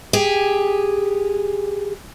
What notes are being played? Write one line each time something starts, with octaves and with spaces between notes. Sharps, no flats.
G4 G#4